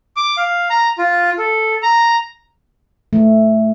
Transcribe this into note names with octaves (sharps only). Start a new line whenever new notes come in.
D6
F5
A#5
F4
A4
A#5
A3